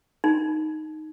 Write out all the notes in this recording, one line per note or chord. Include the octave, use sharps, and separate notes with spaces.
D#4